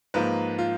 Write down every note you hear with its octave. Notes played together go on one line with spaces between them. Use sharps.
G#2 F3 A#3 B4
F4